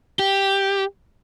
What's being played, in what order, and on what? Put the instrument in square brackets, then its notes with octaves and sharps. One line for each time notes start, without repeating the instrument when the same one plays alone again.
[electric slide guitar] G4